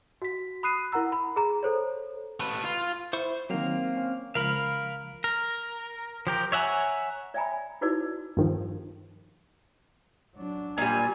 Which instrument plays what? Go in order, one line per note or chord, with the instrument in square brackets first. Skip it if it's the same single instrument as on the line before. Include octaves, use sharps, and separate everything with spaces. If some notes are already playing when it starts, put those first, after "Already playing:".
[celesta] F#4 B6
B5 D#6 F#6 C7 D#7
E4 A#4 F#5 A#5 E6
B5
G#4 A#5
A4 C5 C#5
[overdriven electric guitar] A3 B4
F4
[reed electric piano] E4 [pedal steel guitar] C5 C#6
[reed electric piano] D#3 F#3 [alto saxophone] A#3 [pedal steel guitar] C4 F5
[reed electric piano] C#4
[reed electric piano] C#2 F3 [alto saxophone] A#4 [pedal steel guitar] F5 B5
[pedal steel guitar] A#4
F3 G4 A#4
C#5 E5 F#5 G#5 A#5
[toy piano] D5 E5 G5 G#5 A#5 B5
D#4 E4 F#4 G#4 B4 D5
[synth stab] G2 D#3 F3
[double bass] F#3 D4
[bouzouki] A#2 G3 [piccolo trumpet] G#5